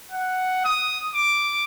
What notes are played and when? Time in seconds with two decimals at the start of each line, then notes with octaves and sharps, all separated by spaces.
0.12 F#5
0.65 D#6
1.15 D6